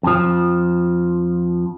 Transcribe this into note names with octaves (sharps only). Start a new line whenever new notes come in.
F2 F3